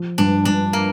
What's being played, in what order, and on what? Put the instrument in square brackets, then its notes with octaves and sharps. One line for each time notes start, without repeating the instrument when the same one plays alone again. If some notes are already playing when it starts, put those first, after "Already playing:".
Already playing: [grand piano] F3
[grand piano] G2 [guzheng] D4
[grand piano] G2 [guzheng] D4
[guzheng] A#3